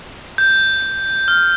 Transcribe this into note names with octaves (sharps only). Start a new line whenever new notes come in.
G6
F6